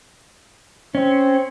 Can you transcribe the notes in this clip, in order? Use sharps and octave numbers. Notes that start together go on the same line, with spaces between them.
C4 C#4